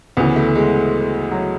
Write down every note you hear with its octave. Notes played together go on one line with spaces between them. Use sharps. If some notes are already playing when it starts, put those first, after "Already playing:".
D2 C#3 E3 B3
A3
G#3
F#3